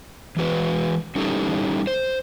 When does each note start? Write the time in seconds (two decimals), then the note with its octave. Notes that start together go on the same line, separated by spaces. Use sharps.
0.37 E3 G#3 F#4 B4
1.16 G3 C#4 D#4 E4 G4 A4
1.87 C5